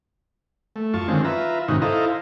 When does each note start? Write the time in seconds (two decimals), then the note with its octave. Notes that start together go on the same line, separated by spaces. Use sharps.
0.76 A3
0.94 F#2 F4 A5 C#6
1.08 D3 D#3 F#3 G#3 C4 C#4
1.24 F4 B4 E5 A#5
1.68 G#2 C3 D#3 C#4 D#4 F#4
1.82 E4 A4 C5 D#5 F5 A#5